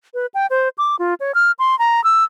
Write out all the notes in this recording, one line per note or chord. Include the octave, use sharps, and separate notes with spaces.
B4
G5
C5
D6
F4
C#5
F6
C6
A#5
E6